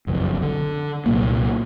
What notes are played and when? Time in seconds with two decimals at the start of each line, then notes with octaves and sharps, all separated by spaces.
0.07 F#1 B1 F2
0.42 D3
1.06 C2 A#2 F#3 A#3